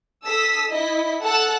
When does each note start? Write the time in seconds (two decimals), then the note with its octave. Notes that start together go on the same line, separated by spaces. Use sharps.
0.23 A4 D#6 E6 B6
0.69 E4 D#5 B6
1.20 A4 F#5 A5 E6 F#6